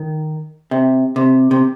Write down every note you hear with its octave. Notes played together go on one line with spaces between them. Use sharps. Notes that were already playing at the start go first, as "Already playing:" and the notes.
Already playing: D#3
C3
C3
C3